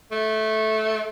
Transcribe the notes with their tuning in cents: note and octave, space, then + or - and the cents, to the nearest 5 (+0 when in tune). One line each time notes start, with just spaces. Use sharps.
A3 -10